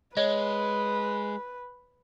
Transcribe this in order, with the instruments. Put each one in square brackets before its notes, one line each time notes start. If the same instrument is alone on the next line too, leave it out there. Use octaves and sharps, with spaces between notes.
[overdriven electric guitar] G#3 [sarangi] B4 [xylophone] C#5 D#5